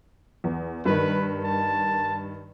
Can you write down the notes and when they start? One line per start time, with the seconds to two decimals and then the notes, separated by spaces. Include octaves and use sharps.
0.44 E2
0.85 G2 D#3 B4
1.44 A5